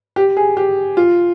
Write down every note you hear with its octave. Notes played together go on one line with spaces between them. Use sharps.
G4
G#4
G4
F4